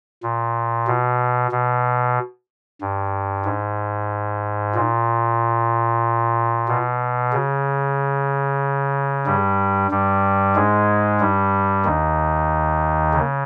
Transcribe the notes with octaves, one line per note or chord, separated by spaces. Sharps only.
A#2
B2
B2
G2
G#2
A#2
B2
C#3
G2 G3
G2 G3
G#2 G#3
G2 G3
D#2 D#3
C#3